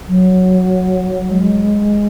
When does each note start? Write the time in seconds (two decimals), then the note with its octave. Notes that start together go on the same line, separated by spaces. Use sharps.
0.08 F#3
1.31 G#3